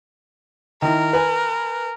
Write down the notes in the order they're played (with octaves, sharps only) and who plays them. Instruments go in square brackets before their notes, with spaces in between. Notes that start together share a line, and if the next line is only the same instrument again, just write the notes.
[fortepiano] D#3 E4 [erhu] A#4
[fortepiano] B4 G#5